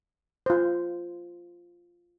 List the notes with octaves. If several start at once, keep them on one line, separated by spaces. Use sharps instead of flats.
F4 C5